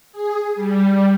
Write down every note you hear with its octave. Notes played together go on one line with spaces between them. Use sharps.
G#4
G3